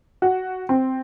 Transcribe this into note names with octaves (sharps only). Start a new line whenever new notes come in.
F#4
C4